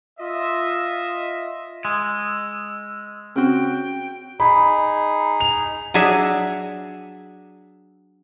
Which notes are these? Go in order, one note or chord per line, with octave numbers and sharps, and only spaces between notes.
F4 D#5 E5
G#3 E6
C#3 C4 C#4 F#4 G5
D#4 G#4 B5
F7
F#3 D4 G#4 E5